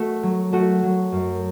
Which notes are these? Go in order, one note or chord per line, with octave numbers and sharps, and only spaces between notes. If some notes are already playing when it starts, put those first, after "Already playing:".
Already playing: A3 F#4
F#3
A3 F#4
F#3
F#2